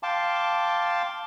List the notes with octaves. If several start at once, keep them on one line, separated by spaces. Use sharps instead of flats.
F5 G5 A5 C6 D6